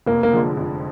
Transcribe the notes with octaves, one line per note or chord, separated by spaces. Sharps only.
F1 A#3
A#3
F2 D3 F3 G#3
F1